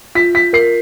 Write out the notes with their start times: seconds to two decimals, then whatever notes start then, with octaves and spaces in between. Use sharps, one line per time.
0.15 F4 B6
0.35 B6
0.53 A#4 C7